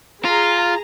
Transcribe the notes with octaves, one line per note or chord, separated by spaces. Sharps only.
F4 G#4 A#5